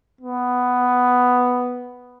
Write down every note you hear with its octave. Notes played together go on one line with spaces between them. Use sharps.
B3